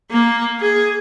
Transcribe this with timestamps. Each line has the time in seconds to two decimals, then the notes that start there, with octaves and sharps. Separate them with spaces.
0.11 A#3
0.60 G#4